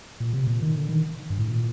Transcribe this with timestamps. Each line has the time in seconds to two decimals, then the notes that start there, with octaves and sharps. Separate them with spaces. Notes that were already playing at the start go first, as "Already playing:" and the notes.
0.20 A#2
0.33 C3
0.47 A#2
0.62 D#3
0.76 D3
0.89 D#3
1.30 G2
1.39 A2
1.48 A#2